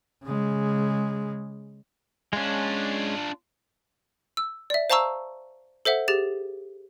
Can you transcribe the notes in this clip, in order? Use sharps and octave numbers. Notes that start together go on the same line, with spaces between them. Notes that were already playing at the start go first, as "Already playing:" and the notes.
C#3 G#3
G#3 C#4 D4 F4
E6
D5 E5
C5 F5 A5 A#5 C#6 E6
A4 C5 E5 F#5
G4 G#4 A6